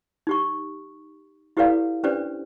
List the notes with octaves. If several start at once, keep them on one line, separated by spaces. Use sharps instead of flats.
D#4 G4 C#6
E4 G4 A4 B4 D5 F5
C#4 D4 G4 B4 C5 D5